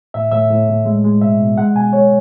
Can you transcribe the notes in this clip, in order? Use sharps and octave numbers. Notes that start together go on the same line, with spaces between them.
A2 E5
A2 E5
A2
A2
G#3
G#3
B2 E5
B2
G#3 F#5
B2 G#5
G#3 C#5